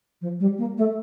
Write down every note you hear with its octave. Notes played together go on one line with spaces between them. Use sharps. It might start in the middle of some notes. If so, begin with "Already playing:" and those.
F3
G3
A#3
A3